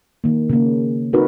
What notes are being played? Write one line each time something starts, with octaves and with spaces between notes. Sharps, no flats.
D#3 A#3
C#3 A#3
C4 D#4 F#4 A#4 B4